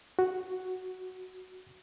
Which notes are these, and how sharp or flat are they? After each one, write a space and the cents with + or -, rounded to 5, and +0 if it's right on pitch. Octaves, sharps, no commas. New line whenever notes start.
F#4 +0